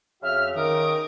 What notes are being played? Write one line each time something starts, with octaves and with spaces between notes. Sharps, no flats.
F2 C#3 F#4 E5 F6
D#3 A#4 D6 D#6